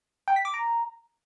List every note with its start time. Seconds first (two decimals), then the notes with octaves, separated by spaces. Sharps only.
0.28 G5
0.36 B6
0.45 D6
0.54 A#5